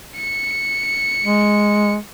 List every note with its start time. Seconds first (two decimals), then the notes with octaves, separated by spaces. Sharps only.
0.16 C#7
1.24 G#3